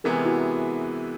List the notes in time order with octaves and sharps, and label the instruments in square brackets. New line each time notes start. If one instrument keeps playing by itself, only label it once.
[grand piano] C3 E3 G#3 B3 [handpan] G#4 A#4
[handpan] E4 F#4